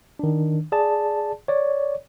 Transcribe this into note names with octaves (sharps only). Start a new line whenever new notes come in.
D#3 D4
G#4 D5 A5
C#5 D5